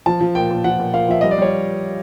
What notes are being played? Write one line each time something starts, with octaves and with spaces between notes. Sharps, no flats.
F3 A5
F3
A#2 G5
A#2
F3 F#5
A#2
A#2 F5
F3 E5
G3 D#5
D5
G3 C#5